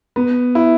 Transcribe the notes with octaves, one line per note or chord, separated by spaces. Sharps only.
B3
E4